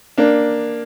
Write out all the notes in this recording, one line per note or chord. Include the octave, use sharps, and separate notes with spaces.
A#3 D4